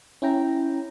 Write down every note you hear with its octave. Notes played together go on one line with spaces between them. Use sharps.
C#4 E4 G5 A#5